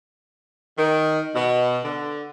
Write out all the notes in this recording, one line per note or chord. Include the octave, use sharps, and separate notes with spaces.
D#3
B2
D3